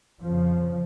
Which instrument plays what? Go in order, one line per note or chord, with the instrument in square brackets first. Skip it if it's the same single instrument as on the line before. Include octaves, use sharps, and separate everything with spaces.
[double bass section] F2 C#3 F3